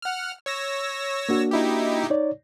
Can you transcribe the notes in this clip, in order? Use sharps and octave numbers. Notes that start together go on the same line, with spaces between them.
F#5 F6
C#5 E6 A#6
A#3 D4 F#4
D#4 E4 G4
D#4 C#5 D5